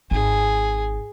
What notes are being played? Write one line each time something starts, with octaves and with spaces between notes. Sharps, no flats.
G#1 G#4